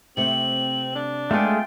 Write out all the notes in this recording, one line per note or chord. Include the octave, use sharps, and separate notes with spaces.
C3 A3 C4 F#7
D4
G#3 A3 B3 F4 G#4 G5